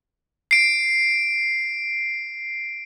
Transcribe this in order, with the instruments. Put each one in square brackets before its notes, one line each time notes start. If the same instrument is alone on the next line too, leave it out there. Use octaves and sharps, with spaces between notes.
[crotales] C7 D7